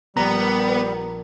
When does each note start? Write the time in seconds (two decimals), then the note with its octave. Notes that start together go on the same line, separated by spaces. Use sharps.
0.17 A#1 G3 B3 A#5